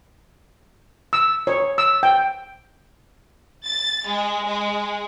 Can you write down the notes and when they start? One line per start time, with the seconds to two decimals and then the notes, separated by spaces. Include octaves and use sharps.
1.13 E6
1.47 C#5
1.78 E6
2.03 G5
3.64 A6
4.06 G#3
4.46 G#3